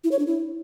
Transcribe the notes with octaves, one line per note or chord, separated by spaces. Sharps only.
E4
C#5
D4
E4